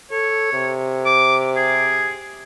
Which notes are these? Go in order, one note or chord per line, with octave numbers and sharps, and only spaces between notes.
A4 C#5
C3
D6
G#4